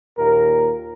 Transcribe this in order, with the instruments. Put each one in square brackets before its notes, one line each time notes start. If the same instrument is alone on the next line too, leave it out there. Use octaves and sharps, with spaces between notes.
[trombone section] D#2 A#2 A#4